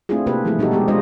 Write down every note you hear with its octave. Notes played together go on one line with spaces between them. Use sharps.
A3 C4 D4 E4 F4 G#4
C3 A#3 F4 G4 A4 B4
E3 F3 G3 A3 E4 G#4
B2 G3 D#4 F#4 G4 A4
G#3 B3 G4 G#4
G3 G#3 D4 F4 C5 D#5